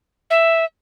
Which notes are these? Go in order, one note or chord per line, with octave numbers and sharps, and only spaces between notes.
E5